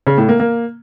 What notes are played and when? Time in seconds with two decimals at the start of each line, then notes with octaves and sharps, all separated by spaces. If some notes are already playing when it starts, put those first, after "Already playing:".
0.07 C#3
0.18 A2
0.29 A#3
0.40 A#3